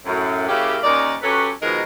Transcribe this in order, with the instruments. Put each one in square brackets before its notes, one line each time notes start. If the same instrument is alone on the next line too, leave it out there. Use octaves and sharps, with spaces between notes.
[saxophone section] F#2 A2
C#3 F#3 A#3 E4 G4
D#2 C#4 D#4 A#4 D5
F#3 C#4 G4 A4 B4 C#5
B2 D#3 F3 G#3 D#4 A#4